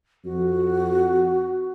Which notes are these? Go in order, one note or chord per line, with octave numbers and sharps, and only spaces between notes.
F2 F#4